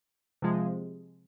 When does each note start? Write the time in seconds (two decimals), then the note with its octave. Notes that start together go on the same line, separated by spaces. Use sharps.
0.42 C3 F3 G#3